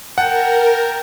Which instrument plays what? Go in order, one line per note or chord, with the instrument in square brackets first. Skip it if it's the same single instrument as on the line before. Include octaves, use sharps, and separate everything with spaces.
[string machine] A#4 [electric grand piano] F#5 [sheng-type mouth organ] G5 A5